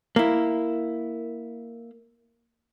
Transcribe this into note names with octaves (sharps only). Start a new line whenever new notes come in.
A#3 E4